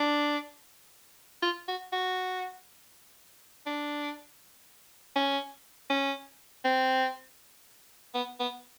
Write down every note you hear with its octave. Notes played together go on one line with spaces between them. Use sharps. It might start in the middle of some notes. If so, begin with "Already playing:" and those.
Already playing: D4
F4
F#4
F#4
D4
C#4
C#4
C4
B3
B3